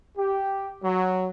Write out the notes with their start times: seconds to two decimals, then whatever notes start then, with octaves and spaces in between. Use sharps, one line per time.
0.17 G4
0.83 F#3